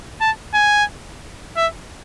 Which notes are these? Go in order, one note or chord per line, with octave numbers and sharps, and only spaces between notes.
A5
G#5
E5